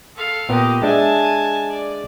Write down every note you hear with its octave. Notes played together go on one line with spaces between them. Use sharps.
A4 F5
A#2 B3 G4 D#5
G#3 D4 E5 G#5 A5
D5